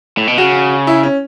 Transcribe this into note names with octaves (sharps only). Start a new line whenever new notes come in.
A2
B2
C#3 F#4
E4
C#4